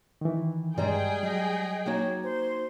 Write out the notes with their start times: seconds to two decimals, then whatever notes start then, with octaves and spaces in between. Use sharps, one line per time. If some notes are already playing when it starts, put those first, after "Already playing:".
0.21 D#3 E3
0.78 G2 G3 G#3 G#4 G5 A#5
1.23 F#3 D#5
1.86 A#3 D#4 F#4 C#5
2.23 C5